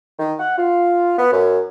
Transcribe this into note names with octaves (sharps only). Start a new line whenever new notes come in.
D#3
F#5
F4
B3
F#2